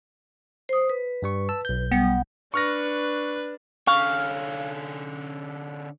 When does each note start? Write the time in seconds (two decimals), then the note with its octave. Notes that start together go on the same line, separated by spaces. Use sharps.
0.69 C5 D#6
0.90 B4
1.22 G2 G3 C#6
1.49 A5 E6
1.65 B1 G6
1.92 G3 B3
2.54 D4 B4 C#6 F6 A#6
3.87 D3 C#4 F5 C#6